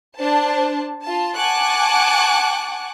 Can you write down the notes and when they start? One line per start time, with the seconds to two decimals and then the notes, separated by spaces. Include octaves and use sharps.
0.17 D4 C5 A5
1.03 F4 A5
1.35 F#5 G#5 A5 C#6 D6 F#6